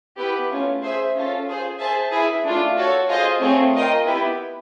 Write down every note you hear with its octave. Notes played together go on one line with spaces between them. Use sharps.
B3 E4 G4 B4
A3 C#4 F4
G#4 C5 E5
C#4 F4 A4
F4 G#4 C5
G#4 C5 E5 A5
E4 G#4 B4 E5
A3 D4 F4
F#4 A4 C#5
F4 G#4 C5 D#5
A3 C4 F4 G#4 C#5
F4 A#4 D#5 G5
B3 E4 G4 B4